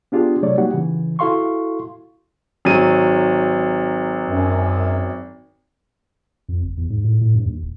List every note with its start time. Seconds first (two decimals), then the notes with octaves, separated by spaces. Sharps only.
0.12 B3 D4 F4 G4 G#4
0.43 C3 F#3 A3 C#5 D5
0.57 G3 A#3 D#4 F#4 G4 F#5
0.73 C#3 E3
1.19 E4 F#4 A4 F5 C6 C#6
2.65 G#1 F#3 D#7
4.26 F#2
6.49 F2
6.63 F#1
6.77 E2
6.90 G#2
7.04 A2
7.21 A2
7.35 G2
7.46 D#2
7.63 D#1